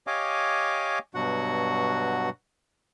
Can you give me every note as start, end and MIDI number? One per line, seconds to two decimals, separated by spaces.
0.07 0.99 67
0.07 0.99 73
0.07 0.99 75
0.07 0.99 77
0.07 0.99 80
0.07 0.99 86
1.14 2.30 43
1.14 2.30 47
1.14 2.30 54
1.14 2.30 66
1.14 2.30 78